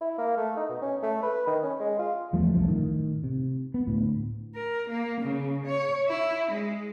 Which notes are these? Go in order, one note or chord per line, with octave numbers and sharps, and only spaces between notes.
E4
A#3
A3
D#4
B2
C#4
A3
B4
D#3
C#4
G#3
F4
E2 F3 G3 A3
C2 F#2 F3 A3
A2 D#3
C3
B3
D2 A2
A#4
A#3
C#3
C#5
E4
G#3